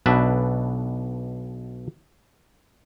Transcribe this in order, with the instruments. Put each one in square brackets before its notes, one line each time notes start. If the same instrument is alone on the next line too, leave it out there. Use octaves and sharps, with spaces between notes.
[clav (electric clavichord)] B1 B2 D4 B4 E5